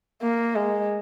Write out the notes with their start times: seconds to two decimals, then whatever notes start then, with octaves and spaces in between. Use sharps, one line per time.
0.22 A#3
0.55 G#3